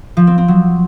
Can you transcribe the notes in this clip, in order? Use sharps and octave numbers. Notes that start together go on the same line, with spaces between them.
F3
C4
C4
F#3